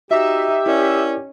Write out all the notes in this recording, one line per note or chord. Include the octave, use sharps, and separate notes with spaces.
D#4 F#4 G4 E5 D6
C#4 E4 A#4 D5